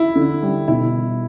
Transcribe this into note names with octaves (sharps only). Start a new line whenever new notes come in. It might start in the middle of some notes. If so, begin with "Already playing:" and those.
Already playing: E4
D3
G3
B2 E4